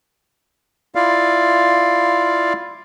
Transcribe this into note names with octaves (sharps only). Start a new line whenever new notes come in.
E4 F4 D5 F5